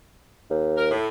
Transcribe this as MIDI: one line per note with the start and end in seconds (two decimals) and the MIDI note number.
0.50 0.92 39
0.77 0.90 70
0.91 1.08 45